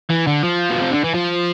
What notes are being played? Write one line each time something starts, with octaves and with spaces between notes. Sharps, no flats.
E3
D3
F3
B2
C3
D3
E3
F3